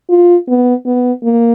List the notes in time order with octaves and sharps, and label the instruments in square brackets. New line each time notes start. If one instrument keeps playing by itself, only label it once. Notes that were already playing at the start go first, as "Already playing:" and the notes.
[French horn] F4
B3
B3
A#3